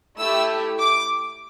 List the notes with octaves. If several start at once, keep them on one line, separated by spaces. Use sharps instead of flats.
A3 E4 G4 E6
D6